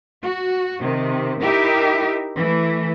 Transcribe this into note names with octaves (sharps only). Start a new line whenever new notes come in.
F#4
C3 D#3
D#4 E4 G4 A#4 E5
E3 A3